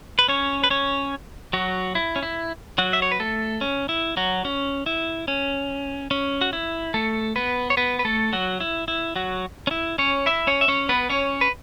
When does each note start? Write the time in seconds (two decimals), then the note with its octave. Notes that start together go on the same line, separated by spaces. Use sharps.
0.19 B4
0.28 C#4 C#5
0.64 B4
0.70 C#4 C#5
1.53 F#3 F#4
1.95 E4
2.16 C#4
2.23 E4
2.78 F#3 F#4
2.93 E5
3.02 C#5
3.11 B4
3.20 A3 A4
3.61 C#4
3.89 E4
4.17 F#3 F#4
4.45 C#4
4.86 E4
5.28 C#4
6.11 C#4
6.41 F#4
6.53 E4
6.94 A3 A4
7.36 B3 B4
7.70 C#5
7.77 B3 B4
7.99 B4
8.05 A3 A4
8.33 F#3 F#4
8.60 E4
8.88 E4
9.16 F#3 F#4
9.67 C#4
9.71 E4
9.98 C#4 C#5
10.26 E4 E5
10.47 C#4 C#5
10.61 E5
10.68 C#4 C#5
10.89 B3 B4
11.10 C#4 C#5
11.41 B4